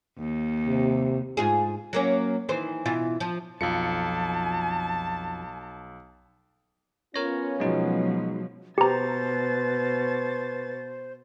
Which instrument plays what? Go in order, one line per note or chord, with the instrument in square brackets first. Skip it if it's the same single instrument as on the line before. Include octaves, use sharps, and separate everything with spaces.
[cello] D#2
[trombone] C3
[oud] G#2 F4 G#4
F#3 A#3 C#4
D#3 E3 C5
B2 E3 F4
F3
[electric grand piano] B1 C#7 [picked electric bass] F2 F3 [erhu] A5
[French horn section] B3 C#4 F4 [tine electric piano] A#4 C#5 A#6
[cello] B2 F3 [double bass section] F#3 [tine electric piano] G#3 D#4
[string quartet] B2 A6 [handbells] G4 A#5 [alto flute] B4 [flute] C5